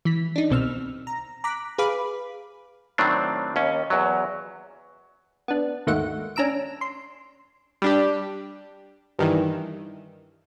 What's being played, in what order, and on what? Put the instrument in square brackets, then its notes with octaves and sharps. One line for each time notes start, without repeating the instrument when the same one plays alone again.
[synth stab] E3 B6
D4 D#4
C2 B2 C4 E6 F6
A#5
A#5 D6 F#6 B6
G#4 B4 F5 B5 D6
[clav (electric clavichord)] A2 D#3 F#3 C4 D4
D#2 C#4
E2 F#3
[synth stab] B3 D4
D#2 G#2 A3 A#3 F#4 F#5
C#4 D4 A#5 E6 D7
C6
G3 D4 G4
G2 D#3 E3